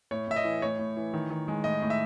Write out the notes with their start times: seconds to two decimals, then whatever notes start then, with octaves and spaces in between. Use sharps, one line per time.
0.11 A2 C#5
0.28 A2 E5
0.36 D#5
0.44 E3
0.62 A2 C#5
0.78 A2
0.97 E3
1.14 D#3
1.30 D#3
1.48 G#3
1.64 A2 D#5
1.82 A2
1.90 E5